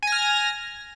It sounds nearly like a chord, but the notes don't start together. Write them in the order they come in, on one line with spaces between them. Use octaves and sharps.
G#5 A#6 F6